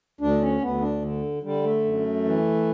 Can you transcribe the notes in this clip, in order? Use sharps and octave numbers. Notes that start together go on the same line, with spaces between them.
D2 D4
C#4
D2 B3
D4
D3
D3 G3
A3
F#2
E3